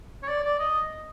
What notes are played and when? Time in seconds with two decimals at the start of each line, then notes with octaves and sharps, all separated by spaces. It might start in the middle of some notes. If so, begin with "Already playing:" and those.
0.23 C#5
0.28 D5
0.43 D5
0.59 D#5